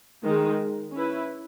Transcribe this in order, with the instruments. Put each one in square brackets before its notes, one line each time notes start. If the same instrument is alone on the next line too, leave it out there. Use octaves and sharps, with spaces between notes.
[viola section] D#3 G#3 D#4
C#4 E4 B4